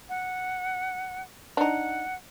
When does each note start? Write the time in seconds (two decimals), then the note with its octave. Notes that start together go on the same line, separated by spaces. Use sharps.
0.09 F#5
1.57 D4 D#4 F#5